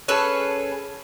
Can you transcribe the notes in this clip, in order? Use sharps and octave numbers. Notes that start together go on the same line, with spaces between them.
C#4 G#4 A4 B4